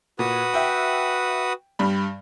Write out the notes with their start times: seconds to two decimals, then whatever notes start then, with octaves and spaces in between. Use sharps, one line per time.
0.19 A#2 F#4 B4 D#6
0.54 E5 G5
1.79 G2 G3 B5